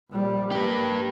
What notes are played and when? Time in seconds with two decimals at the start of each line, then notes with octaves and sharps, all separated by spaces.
0.11 A#1 G3
0.52 A#3 G4 B4